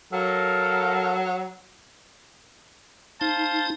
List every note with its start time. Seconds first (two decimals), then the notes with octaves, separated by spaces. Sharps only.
0.13 F#3 A4 A#4 F5
3.21 D#4 C5 F5 A5